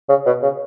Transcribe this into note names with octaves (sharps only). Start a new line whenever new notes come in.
C#3
B2
C#3